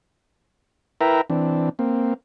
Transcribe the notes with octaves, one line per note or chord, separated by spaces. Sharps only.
E4 A#4 B4 E5 G5 A#5
E3 C4 D4
A#3 C4